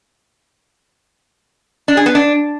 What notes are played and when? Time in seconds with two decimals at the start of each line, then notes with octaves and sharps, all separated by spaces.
1.88 D4
1.97 G#4
2.06 B3
2.15 D4